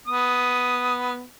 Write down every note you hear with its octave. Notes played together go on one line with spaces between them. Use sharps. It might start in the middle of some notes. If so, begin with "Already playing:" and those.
B3 D#6